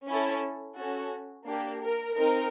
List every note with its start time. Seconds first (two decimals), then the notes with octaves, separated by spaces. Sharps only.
0.09 C#4 E4 A4
0.78 C#4 F#4 A4
1.47 A#3 D4 G4
1.82 A#4
2.16 C4 D#4 A#4